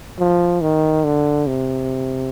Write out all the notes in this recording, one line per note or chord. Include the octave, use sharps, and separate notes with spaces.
F3
D#3
D3
C3